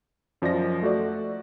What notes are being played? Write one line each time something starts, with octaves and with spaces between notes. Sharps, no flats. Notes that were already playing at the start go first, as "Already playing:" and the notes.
F#2 F3 D5 D#5 A#6
A3 F#4 A4 D5